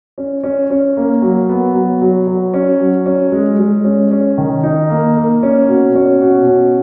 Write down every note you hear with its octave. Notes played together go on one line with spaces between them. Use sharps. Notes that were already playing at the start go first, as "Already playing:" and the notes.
C#4
C#4
C#4
A#3
F#3
B3
F#3
F#3
F#3
C#4
F#3
C#4
G#3
G#3
C#4
C#4
D#3
D#4
A#3
A#3
C#4
B2
C#4
B2
C#4